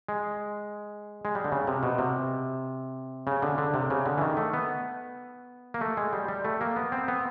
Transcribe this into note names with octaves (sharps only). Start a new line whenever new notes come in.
G#3
G#3
G3
D3
C#3
C3
B2
C3
C#3
D3
D3
C3
C#3
D3
E3
D#3
A3
B3
A#3
A3
G#3
G3
G3
A3
A#3
B3
C4
B3